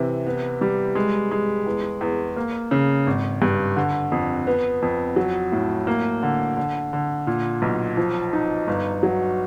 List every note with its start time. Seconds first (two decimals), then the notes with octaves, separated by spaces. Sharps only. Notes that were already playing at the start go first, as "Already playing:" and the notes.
Already playing: C3 E3
0.26 B3
0.61 G3
0.95 G#3
1.31 G#3
1.66 E2
2.01 E2
2.36 A#3
2.71 C#3
3.07 G#1
3.42 G2
3.76 D3
4.12 F2
4.47 B3
4.82 F2
5.16 F#3
5.52 A2
5.87 A#3
6.23 D3
6.57 D3
6.93 D3
7.27 A#2
7.62 B1
7.97 F3
8.33 D#4
8.68 G1
9.03 F#3